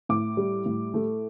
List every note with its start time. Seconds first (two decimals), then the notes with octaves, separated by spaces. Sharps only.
0.09 A2 D6
0.37 G3
0.66 A2
0.94 A3